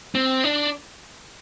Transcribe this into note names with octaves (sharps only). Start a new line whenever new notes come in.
C4
D4